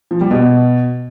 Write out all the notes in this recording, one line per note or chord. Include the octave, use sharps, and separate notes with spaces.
F3
G3
B2